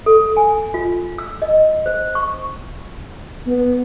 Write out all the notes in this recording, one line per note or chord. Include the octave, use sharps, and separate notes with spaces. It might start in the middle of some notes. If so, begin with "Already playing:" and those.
A4
G#5
F4
E6
D#5
C5
C#6
B3